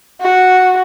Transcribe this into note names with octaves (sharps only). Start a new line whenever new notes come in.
F#4